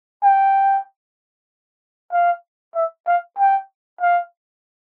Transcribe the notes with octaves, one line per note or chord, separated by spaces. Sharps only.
G5
F5
E5
F5
G5
F5